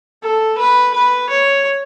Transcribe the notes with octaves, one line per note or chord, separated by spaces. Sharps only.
A4
B4
B4
C#5